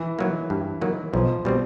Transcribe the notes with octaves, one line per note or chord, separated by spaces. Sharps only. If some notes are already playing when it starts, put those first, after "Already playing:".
Already playing: E3
D#3 F#3 A#3
G2
D#3 F#3 A#3
B1 F3
B2 G3 C4